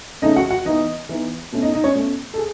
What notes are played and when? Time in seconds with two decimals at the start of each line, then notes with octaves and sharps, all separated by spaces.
0.22 C#3 E3 A3 C#4 D#4 D#5
0.36 F#4 F#5
0.51 F#4 F#5
0.65 E3 B3 D#4 D#5
1.09 E3 B3 D#4
1.52 B2 A3 C#4
1.62 D#4 D#5
1.73 D#4 D#5
1.84 C#4 C#5
1.95 B2 A3 C#4
2.34 A4
2.38 G#4